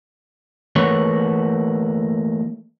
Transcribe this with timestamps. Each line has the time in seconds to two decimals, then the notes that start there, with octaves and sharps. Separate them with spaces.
0.76 E3 A3 A#3 B4 C#5